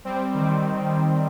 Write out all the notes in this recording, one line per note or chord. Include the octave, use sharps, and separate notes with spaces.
G3 C4
G3
D#3
G3